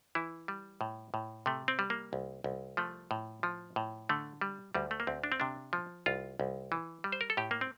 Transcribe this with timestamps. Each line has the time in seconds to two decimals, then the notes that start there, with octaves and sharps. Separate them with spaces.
0.15 E3 E4
0.48 G3
0.81 A2
1.14 A2
1.46 C3 A3
1.68 C4
1.79 G3
1.90 A#3
2.13 C2
2.44 C2
2.77 F3 A3
3.11 A2
3.43 F3
3.76 A2
4.09 D3 A3
4.41 G3
4.75 D2 G3
4.91 A3
5.00 A#3
5.07 D2 C4
5.24 D4
5.32 C4
5.40 C3 D4
5.73 F3
6.06 C2 F4
6.40 C2
6.72 E3
7.04 G3
7.12 C5
7.21 A#4
7.30 A4
7.37 A2 G4
7.51 A#3
7.61 C4